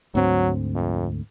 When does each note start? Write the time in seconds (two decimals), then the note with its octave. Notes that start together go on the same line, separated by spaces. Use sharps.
0.15 D2 G#2 F#3 C4
0.75 F2